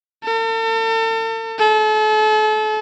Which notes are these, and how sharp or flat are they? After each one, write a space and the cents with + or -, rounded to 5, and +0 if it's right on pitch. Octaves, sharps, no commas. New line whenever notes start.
A4 +40
A4 -40